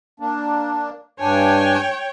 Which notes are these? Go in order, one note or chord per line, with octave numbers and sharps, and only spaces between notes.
A#3 D4
G2 D4 C#5 G5 G#5